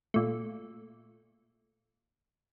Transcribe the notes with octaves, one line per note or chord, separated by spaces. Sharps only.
A#2 A3